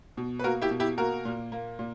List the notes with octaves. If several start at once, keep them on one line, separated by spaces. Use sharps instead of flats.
B2
B4
A#3 F#4 A#4
E4 G4
B2
E4 G4
A#3 F#4 A#4
A#2
A#3
A#2